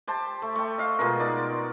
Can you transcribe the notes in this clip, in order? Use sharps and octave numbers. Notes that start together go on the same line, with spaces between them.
G4 C5 A5
A3
A3 G5
D#5 F5
B2 G#3 F4 A#4
D#4 D5